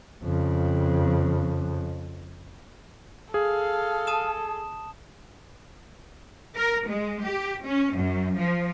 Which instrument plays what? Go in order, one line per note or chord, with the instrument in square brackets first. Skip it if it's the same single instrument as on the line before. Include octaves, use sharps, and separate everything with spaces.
[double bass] F2 C#3
[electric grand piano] G#4 [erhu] A4 [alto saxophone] F5
[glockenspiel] A5 D#6 E7
[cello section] A#4
G#3
G4
C#4
F#2
F3